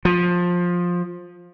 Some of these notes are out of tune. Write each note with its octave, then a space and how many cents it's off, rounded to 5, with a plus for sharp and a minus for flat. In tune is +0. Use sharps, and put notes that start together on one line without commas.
F3 +15